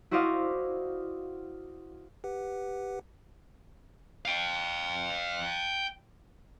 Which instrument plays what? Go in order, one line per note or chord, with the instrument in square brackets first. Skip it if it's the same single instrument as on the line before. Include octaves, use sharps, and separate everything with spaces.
[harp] E4 F#4 C5 D5 D#5 F5
[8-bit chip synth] G4 B4 F#5
[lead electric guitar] F5 G5